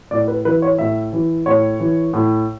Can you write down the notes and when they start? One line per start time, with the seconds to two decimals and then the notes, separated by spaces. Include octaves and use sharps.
0.11 A2 D5
0.28 B4
0.45 E3 B4
0.62 C#5
0.78 A2 E5
1.13 E3
1.46 A2 C#5
1.80 E3
2.13 A2